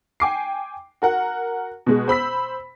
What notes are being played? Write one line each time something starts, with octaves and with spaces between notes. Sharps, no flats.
G5 G#5 D6 C7
F#4 A#4 F#5
B2 G#3
C5 B5 E6 B6